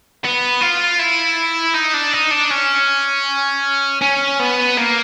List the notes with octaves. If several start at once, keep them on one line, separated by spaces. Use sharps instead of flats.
B3
F4
E4
D#4
D4
D#4
D4
C#4
C#4
B3
A#3